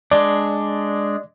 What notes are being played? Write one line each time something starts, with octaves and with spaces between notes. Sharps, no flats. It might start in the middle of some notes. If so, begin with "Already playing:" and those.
G#3 D4 D5